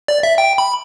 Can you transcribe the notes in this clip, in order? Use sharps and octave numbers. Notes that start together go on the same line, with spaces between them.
D5
E5
G5
B5